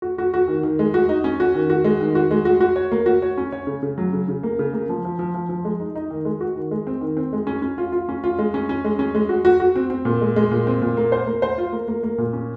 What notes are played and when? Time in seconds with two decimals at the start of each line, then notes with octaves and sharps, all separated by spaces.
0.02 F#4
0.18 F#4
0.34 F#4
0.48 D#3
0.63 D#3
0.79 G#3
0.94 F#4
1.09 D#4
1.24 C#4
1.40 F#4
1.55 D#3
1.70 F#4
1.84 G#3
2.00 D#3
2.15 F#4
2.31 G#3
2.45 F#4
2.61 F#4
2.76 C#5
2.92 A#3
3.06 F#4
3.22 C#5
3.38 C#4
3.52 C#5
3.67 C#3
3.83 C#3
3.98 F#3
4.13 C#3
4.28 C#3
4.43 A#3
4.59 C#3
4.74 A#3
4.89 F3
5.05 F3
5.19 F3
5.34 F3
5.49 F3
5.65 G#3
5.80 D#4
5.95 D#4
6.11 D#3
6.25 G#3
6.41 F#4
6.56 D#3
6.71 G#3
6.87 C4
7.01 D#3
7.17 C4
7.33 G#3
7.47 C#4
7.62 C#4
7.78 F4
7.92 F4
8.09 C#4
8.24 F4
8.39 G#3
8.54 C#4
8.69 C#4
8.85 G#3
8.99 C#4
9.15 G#3
9.29 F#4
9.45 F#4
9.60 F#4
9.75 C4
9.90 C4
10.05 A#2
10.21 G#3
10.36 G#3
10.51 A#2
10.67 C4
10.82 A#2
10.97 A#3
11.12 C5
11.27 A#3
11.42 C5
11.58 F4
11.73 A#3
11.88 A#3
12.03 A#3
12.18 A#2
12.33 C#4